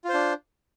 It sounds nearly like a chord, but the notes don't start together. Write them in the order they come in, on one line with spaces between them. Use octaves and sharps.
F4 C5 D4